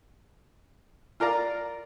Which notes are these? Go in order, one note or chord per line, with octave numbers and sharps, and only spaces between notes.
F4 A#4 D5 A#5